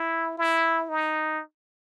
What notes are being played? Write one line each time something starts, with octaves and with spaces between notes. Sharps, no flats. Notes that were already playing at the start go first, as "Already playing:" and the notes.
Already playing: E4
E4
D#4